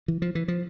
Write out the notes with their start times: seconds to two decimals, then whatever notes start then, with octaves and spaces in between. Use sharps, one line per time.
0.08 E3
0.22 F3
0.35 E3
0.48 F3